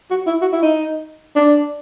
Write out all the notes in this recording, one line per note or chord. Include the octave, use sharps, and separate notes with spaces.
F#4
E4
F#4
E4
D#4
D4